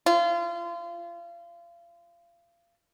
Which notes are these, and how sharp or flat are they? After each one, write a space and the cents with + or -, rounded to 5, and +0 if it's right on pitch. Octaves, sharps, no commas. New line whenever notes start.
F4 -30